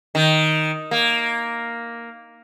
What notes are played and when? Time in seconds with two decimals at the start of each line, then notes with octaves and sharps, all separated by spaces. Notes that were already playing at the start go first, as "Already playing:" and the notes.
0.15 D#3
0.91 A#3